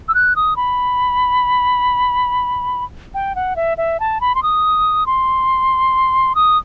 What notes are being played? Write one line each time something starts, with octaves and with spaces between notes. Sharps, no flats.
E6
F#6
D#6
B5
G5
F#5
E5
E5
A5
B5
C6
D#6
C6
D#6